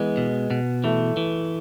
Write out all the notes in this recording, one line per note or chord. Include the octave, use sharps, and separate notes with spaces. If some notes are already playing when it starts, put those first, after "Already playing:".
Already playing: E3 G#3 B3
B2
B2
E3 A3
E3